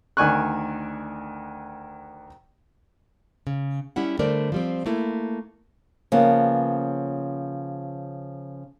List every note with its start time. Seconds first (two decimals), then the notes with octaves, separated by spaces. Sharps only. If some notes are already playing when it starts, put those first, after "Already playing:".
0.17 D2 D#3 D5 G#5 C#6 F#6
3.47 C#3
3.96 G3 C#4 E4 F#5
4.19 D3 G3 A3 A#4 C5 D5
4.52 F3 G3 C4
4.86 A3 A#3 E4
6.12 C#3 F3 A#3 B3